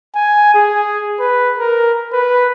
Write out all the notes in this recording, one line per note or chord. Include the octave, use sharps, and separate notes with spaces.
G#5
G#4
B4
A#4
B4